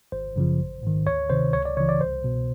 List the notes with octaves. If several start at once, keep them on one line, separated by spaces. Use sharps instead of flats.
G#1 C5
F#2 C#3 F3
A1
G#2 D#3
D2 C#5
C3 D#3 C5
C#2 C#5
D5
C#3 E3 C#5
D5
C2 C5
B2